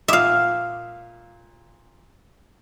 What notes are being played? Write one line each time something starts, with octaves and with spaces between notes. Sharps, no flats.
A#2 E5 F5 D6 D#6